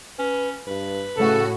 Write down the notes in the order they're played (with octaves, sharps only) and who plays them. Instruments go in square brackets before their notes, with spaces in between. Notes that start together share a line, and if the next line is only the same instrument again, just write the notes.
[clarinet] C#4 [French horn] B4
[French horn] G2 [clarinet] B4
[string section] A2 F#4 [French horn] C#3 [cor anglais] A4